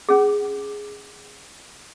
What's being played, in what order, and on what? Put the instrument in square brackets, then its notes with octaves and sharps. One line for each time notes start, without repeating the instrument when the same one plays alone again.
[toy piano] C#4 G#4